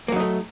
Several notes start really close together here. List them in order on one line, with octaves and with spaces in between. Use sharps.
A#3 F#3 D#4 A3